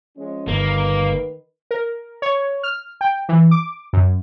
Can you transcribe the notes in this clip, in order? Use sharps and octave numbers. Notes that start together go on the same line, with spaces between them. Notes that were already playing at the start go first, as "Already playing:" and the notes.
F3 G#3 C#4
G1 D#3 A#3 B4
A#4
C#5
F6
G5
E3
D6
F#2